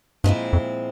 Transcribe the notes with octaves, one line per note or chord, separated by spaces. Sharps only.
G2 A#2 F3 G#3 C4 E4
F2